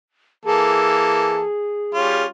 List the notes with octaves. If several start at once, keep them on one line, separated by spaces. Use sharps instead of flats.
E3 A#3 G#4 A4
G3 C#4 F4